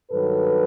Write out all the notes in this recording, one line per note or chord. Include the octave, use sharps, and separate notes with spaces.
G2 D#3 F#3 A4 B4